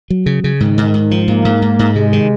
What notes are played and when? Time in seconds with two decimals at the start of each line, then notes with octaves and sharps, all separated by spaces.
0.10 F#3
0.26 C#3
0.44 C#3
0.60 G#2 D#3
0.78 G#2
0.94 G#2
1.11 F3
1.28 G#2 A#3
1.45 G#2
1.62 G#2
1.79 G#2
1.96 C3 G#3
2.13 D#3